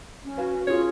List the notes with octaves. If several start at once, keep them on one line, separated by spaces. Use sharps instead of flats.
C#4
F#4 B4 F5 G#5
C#4 F4 G#4 C#5